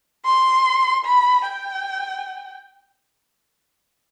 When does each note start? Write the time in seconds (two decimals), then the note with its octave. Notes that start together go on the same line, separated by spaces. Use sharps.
0.25 C6
1.05 B5
1.45 G5